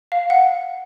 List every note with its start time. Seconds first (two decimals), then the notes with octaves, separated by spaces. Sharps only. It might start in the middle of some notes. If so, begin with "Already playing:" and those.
0.12 F5
0.30 F#5